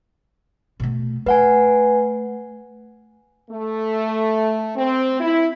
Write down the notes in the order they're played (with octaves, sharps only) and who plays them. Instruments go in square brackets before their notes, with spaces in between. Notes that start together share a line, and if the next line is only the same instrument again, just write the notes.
[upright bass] B2 A3
[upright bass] A3 [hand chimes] B4 F#5 G#5
[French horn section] A3
C4
E4